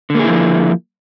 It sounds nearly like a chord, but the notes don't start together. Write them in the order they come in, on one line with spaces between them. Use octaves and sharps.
D3 A#3 G#4 E4 F3